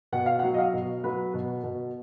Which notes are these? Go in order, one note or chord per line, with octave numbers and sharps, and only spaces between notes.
B2 F#5
F5
F#5
F#3
D#5
F5
B2
F#3 B4
B2
B2